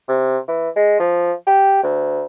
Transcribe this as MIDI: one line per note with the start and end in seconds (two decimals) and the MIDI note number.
0.09 0.37 48
0.48 0.69 52
0.76 1.00 56
1.00 1.33 53
1.47 1.83 67
1.83 2.25 38